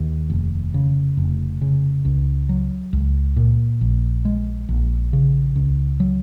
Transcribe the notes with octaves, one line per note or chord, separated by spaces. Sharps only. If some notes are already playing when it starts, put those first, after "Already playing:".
Already playing: D#2
F1
C#3
F1
C#3
C#2
F#3
C#2
A#2
A#1
G#3
A#1
C#3
C#2
F#3